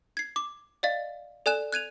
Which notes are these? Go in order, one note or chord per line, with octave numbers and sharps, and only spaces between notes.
G#6 C7
D6
D5 D#5 F5 A6
A4 D5 G#5 F#6 E7
F#6 G#6 D#7 F7